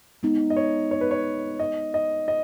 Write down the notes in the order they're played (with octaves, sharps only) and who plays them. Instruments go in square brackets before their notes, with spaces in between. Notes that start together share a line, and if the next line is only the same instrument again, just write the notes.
[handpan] G#3 B3 D#4
[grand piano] D#5
C#5
C#5
B4
C#5
D#5
D#5
D#5